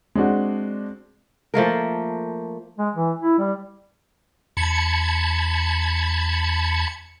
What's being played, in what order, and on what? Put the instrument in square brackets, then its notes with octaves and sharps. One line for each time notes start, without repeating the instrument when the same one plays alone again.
[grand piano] G#3 C4 D4 F#4
[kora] F3 A3 A#3 A#4
[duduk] G#3
E3
E4
G3
[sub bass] E2 [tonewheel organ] A5 B5 G#6 [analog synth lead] C#7